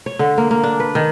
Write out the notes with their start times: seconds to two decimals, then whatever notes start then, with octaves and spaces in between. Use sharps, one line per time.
0.06 C#5
0.19 D3
0.38 A#3
0.51 A#3
0.64 D4
0.80 B4
0.95 D#3